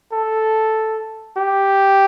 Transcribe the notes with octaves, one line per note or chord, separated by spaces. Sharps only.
A4
G4